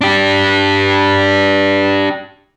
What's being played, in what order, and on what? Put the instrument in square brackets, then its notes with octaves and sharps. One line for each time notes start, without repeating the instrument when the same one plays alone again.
[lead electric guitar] D4 G4